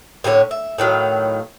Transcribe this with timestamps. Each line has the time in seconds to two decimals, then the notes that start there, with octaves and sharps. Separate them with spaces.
0.24 A2 D3 G#4 C#5
0.51 E5
0.78 A2 D#3 F#3 F5